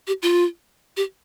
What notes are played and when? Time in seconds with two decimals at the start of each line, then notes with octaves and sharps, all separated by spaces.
0.07 G4
0.22 F4
0.97 G4